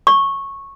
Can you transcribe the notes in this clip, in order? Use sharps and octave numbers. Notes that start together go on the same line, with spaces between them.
C#6